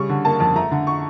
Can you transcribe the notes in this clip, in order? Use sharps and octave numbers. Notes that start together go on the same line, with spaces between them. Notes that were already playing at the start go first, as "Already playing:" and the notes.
Already playing: C#3 G3 C#6
D3
A#3 A5
F2
A3 A#5
D3
C#6